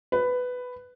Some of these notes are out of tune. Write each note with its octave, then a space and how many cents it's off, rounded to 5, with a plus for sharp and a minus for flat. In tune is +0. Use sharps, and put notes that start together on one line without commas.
B4 +10